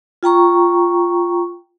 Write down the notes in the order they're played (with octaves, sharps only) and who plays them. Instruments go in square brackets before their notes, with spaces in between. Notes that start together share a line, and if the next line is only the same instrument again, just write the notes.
[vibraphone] F4 G5 A#5 C#6